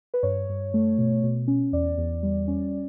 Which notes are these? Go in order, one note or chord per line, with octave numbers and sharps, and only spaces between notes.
B4
G2 C#5
G2
A3
B2
B2
C#4
E2 D5
E2
G3
C#4